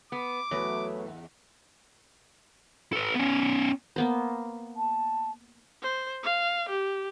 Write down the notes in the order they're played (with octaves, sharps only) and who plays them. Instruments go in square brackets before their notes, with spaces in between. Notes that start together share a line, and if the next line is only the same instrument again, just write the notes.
[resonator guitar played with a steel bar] B3 [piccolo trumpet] D6
[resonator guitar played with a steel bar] E2 [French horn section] E3 F#3 A3 [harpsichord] B4 C#5
[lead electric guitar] A4 B4
B3 C#4
[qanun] A#3 B3 C5
[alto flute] A5
[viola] C5
F5
G4